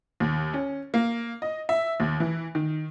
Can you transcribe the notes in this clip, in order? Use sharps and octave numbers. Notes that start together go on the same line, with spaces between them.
D#2
C#4
A#3
D#5
E5
D#2
E3
D#3